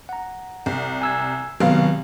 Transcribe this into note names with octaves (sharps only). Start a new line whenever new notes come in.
F#5 A#5
C2
G#5 E6 G#6
F1 B2 D#3 F#3 F5